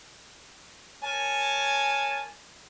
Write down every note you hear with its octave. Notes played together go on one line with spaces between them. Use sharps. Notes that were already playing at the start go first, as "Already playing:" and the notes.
A#4 C#5 G#5 A5